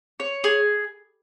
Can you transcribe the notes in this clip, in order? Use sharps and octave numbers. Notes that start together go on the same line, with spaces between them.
C#5
G#4